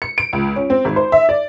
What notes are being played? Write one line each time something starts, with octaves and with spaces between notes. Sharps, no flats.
C#7
D7
C#2
C#4
C4
G#1
C5
E5
D5